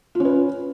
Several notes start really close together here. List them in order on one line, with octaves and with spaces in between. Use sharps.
F4 C#4 B4